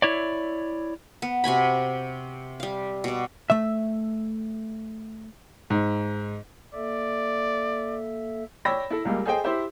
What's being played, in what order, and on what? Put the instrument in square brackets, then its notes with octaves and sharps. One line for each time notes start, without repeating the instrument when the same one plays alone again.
[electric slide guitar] E4 C#5 D5
[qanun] B3
C3 F#4 G#5 B5
G3 F5
B2 D5
[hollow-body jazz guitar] A3 E5
[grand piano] G#2
[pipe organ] A#3 A4 E5 [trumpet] D5
[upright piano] C#5 D5 G5 B5 E6 A#6
E4 A4
C#2 G3 G#3 A#3
G#4 A4 C5 D#5 G5 G#5
E4 G4 C5 E5